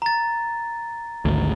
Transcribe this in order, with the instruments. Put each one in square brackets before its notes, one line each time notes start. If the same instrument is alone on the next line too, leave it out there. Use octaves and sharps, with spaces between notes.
[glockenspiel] A#5 A6
[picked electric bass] G#1 D2